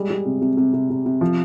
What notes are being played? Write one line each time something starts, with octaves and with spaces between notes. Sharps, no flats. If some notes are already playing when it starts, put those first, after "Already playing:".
Already playing: G3 G#3
G3
C3
C3
C3
C3
C3
C3
F3